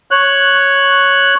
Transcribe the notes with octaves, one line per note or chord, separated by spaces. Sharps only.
C#5 F#6